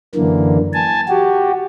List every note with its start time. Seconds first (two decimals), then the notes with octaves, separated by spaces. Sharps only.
0.15 F#2 D3 E3 A#3
0.73 G#5 A5
1.09 F#4 G4